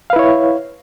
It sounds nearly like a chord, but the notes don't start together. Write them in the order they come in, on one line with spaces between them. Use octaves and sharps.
F5 B4 E4 C#5